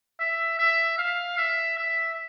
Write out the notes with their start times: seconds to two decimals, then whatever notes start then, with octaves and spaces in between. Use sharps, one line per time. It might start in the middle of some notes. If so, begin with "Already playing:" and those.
0.20 E5
0.59 E5
0.98 F5
1.38 E5
1.78 E5